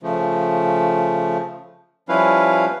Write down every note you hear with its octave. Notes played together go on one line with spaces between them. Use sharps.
C#3 F3 A3
F3 G3 C#4 E4 B4 F5